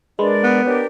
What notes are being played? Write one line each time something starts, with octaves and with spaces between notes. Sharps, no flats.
G#3 D4 A#4 B4 D5 B5 C6
B3
D4 G4 A#4 B4 C#5